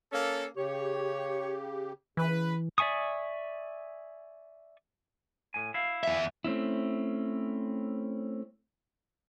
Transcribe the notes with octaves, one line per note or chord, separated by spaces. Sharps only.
A#3 C#4 A4
C#3 G4 C#5
C#3 E3 B4
D5 E5 G#5 C#6 D#6
A2 G#5
E4 F5
E2 E5
A3 C4 C#4 E4